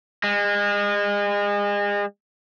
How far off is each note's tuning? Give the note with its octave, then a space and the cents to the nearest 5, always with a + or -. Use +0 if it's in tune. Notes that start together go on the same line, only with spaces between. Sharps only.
G#3 -35